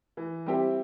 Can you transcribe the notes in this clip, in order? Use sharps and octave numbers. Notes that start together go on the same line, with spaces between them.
E3
G3 C4 E4 G4